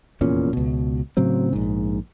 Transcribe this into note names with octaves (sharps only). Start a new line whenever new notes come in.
F1 E2 A#2 C#4
C#2 B2
A2 C#3 F#3 C4
A#1 G#2